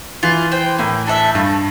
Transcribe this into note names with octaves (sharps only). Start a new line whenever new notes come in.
E3 F4
C5 G5
A2 A#3
D4 A4 E5
G2 A3